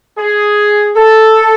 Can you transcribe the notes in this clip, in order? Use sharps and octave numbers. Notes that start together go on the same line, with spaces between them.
G#4
A4